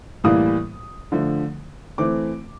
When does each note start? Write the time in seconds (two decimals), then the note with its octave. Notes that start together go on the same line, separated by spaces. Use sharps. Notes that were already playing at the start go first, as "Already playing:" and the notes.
0.24 A2 E3 G3 A#3 D#6
1.12 D3 F3 A3
1.98 E3 A3 C4 D6